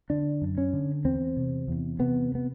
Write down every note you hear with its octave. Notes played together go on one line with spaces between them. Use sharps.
D3 D4
F#2
C#4
D3
E2 C4
C3
E2
C3 B3
B3